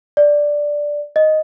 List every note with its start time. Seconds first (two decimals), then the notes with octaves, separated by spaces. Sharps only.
0.17 D5
1.16 D#5